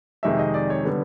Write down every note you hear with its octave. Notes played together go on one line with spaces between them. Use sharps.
F2 C3 D#3 G#3 E5
D#5
D5
C#5
D3 G3 B3